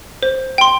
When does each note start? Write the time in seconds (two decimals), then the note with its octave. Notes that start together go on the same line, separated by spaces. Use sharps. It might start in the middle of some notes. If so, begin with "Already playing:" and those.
0.23 C5
0.58 G5 C6